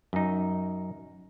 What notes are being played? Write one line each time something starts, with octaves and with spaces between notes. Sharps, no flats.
F#2 D#4